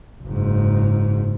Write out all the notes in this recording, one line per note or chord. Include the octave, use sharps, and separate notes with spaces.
F#1 G#2